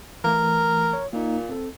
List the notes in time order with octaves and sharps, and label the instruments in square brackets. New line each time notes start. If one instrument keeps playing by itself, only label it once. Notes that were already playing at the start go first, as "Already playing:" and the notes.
[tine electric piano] E3 A3 [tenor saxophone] A#4
[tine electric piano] C#5
[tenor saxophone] A#2 [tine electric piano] A#3 D#4
[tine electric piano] C4 A4